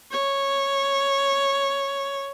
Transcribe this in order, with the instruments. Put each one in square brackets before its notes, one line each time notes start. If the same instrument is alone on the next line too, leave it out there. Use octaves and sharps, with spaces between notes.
[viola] C#5